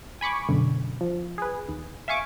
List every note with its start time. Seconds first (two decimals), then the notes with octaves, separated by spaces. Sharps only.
0.21 G#5 B5 C#6 D6
0.49 F#2 B2 D3
1.01 F3
1.38 G#4 B4
1.69 D#2
2.08 E5 F5 G#5 C#6 D6